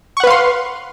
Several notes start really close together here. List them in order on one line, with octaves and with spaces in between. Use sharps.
C#6 F#5 B4 F5 C6